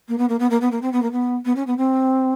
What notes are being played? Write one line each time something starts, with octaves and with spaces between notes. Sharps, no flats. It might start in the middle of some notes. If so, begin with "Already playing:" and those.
A#3
B3
A#3
B3
A#3
B3
A#3
C4
B3
A#3
B3
B3
C#4
B3
C4